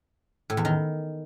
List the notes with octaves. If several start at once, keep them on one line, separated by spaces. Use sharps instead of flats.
A2
E2
D#3